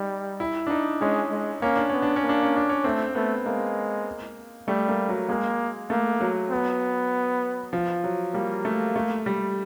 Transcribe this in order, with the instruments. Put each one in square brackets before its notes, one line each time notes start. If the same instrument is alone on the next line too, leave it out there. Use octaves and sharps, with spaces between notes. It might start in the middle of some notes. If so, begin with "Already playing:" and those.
Already playing: [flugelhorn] G3 [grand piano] D#4
[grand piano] E4
D4
D#4
[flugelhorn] G#3 [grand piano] C#4
[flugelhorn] G#3
[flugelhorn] A#3 [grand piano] C#4
[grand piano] D4
[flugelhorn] B3 [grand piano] C#4
[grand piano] D4
C#4
[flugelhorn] A#3
[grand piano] D4
C#4
D4
C#4
[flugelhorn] A3 [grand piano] C4
[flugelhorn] A3 [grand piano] B3
[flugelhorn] G#3 [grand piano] A#3
[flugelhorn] G3 [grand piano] A3
[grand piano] A#3
F#3
[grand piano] G#3 [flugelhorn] A#3
[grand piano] A3 [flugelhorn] A#3
[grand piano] F#3
[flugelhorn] B3
[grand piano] F3
F#3
[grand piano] G3 [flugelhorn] A#3
[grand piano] A3
A3
G3